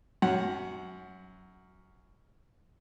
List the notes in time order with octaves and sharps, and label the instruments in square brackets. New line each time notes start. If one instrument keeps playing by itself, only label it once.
[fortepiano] F#2 F#5